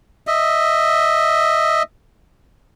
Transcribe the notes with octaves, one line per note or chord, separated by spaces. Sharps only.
D#5 E5